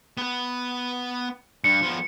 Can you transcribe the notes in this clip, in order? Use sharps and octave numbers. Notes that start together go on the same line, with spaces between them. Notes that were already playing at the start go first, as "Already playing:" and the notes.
B3 B4
G2 C#7
F3 B3